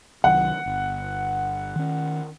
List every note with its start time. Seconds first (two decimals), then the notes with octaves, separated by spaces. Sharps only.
0.24 C2 D#3 F#3 F#5
0.66 G1
1.76 D#3 C#4